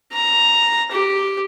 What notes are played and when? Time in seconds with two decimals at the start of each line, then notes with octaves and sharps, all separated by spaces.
0.13 A#5
0.92 G4